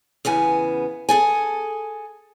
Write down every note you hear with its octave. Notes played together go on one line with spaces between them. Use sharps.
E2 C#3 B3 G#5
G#4 A4 G#5